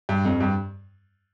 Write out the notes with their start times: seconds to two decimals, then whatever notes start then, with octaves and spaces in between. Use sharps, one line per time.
0.09 G2
0.25 F2
0.40 G2